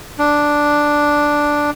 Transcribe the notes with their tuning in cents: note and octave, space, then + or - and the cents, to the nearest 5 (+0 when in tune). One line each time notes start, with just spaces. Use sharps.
D4 +0